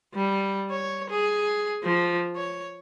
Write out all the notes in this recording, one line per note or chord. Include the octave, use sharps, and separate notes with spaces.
G3
C#5
G#4
F3
C#5